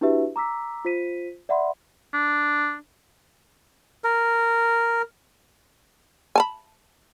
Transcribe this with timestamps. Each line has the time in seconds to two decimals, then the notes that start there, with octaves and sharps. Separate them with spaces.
0.01 D4 E4 F#4 G4 B4 E5
0.36 A#5 D6 E6 B6
0.85 F4 C5 B6 D#7
1.49 D5 E5 F#5 B5 C6
2.14 D4
4.04 A#4
6.36 G#5 A5 B5